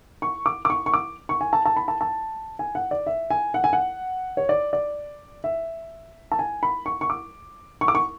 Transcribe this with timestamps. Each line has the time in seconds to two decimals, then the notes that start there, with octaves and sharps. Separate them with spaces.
0.22 C#6
0.46 D6
0.65 D6
0.70 C#6
0.86 C#6
0.94 D6
1.29 C#6
1.41 G#5
1.53 A5
1.65 A5
1.76 B5
1.88 A5
2.01 A5
2.59 G#5
2.75 F#5
2.91 D5
3.07 E5
3.30 G#5
3.54 F#5
3.64 G#5
3.73 F#5
4.37 C#5
4.49 D5
4.73 D5
5.44 E5
6.32 A5
6.39 G#5
6.63 B5
6.86 C#6
7.01 C#6
7.10 D6
7.81 C#6
7.88 D6
7.95 C#6